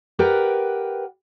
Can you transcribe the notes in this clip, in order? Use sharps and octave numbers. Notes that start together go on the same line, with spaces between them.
G4 A#4 B4 D5 F#5 G5